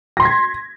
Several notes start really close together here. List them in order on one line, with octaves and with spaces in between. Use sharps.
A#6 C6 B6 G#6